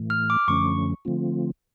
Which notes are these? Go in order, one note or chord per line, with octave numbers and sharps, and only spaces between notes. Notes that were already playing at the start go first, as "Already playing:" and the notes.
Already playing: A2 E3 A3
F6
D6
F#2 D3 F3 A3 C#4 C#6
D3 F3 A3 C4 F4